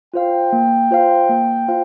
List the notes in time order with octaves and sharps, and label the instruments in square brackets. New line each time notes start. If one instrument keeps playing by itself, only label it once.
[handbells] F4 C5 F5 [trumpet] G5
[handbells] A#3
F4 C5 F5
A#3
F4 C5 F5